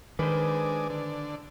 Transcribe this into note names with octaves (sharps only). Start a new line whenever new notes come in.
D#3 G#3 D4 B4 C5
D3